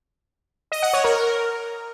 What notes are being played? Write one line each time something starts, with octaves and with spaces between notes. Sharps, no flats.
D#5
F#5
C#5
A#4